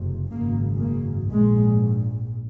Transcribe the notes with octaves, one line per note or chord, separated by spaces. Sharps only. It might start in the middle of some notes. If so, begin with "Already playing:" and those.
Already playing: F#1 F2 C3
G#1 F#2 C#3 A#3
A#3
A#1 G#2 G#3